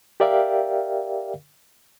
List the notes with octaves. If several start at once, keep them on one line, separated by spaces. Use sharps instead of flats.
G4 A#4 D5 E5 F5 G5